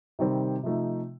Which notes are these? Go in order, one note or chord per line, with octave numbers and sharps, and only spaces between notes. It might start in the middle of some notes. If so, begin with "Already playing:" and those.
C3 D#3 G3 C4
C3 F3 A3 D#4